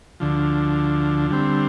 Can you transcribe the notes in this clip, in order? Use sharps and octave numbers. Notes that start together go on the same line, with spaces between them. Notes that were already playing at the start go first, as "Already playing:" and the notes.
D2 D3 F3
D3 G3 C4